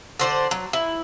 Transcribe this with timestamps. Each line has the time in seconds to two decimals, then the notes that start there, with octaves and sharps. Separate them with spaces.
0.20 D3 C5 D5
0.51 F#3
0.73 E4